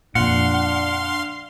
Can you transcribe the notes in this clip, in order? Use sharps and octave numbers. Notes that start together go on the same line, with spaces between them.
F2 A#2 D4 F5 F#5 C6